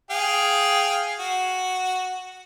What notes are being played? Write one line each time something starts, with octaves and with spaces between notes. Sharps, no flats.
G#4 F5 G5
F#4